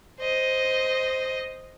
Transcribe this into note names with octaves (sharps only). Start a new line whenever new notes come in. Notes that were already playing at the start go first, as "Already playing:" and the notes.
C5 D#5